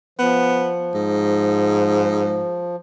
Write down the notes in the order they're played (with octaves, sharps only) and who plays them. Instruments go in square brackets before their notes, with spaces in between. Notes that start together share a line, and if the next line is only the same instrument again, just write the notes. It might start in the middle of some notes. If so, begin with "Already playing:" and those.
[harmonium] F3 [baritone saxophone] B3
[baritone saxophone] G#2